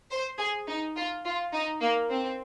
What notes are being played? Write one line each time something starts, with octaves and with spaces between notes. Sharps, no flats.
C5
G#4
D#4
F4
F4
D#4
A#3
C4